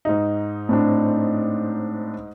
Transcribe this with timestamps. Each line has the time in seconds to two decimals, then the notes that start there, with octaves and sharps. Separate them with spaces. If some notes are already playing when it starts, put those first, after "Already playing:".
0.05 G#2 D#4
0.69 A2 C4 D4